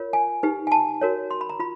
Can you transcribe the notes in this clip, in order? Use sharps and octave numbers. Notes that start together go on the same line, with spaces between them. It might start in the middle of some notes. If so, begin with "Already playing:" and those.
Already playing: F4 A#4 C#5
G#5
D#4 G4 B4
G#5
A5
F#4 A#4 C#5
C6
B5
A#5
F4 B5